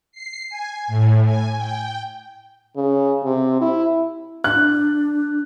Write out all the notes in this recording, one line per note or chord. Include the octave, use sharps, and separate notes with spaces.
C7
G#5
A2
G#5
G5
C#3
C3
E4
D4 F#6